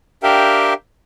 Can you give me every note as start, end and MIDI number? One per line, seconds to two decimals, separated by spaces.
0.23 0.74 62
0.23 0.74 67
0.23 0.74 70
0.23 0.74 76
0.23 0.74 77
0.23 0.74 79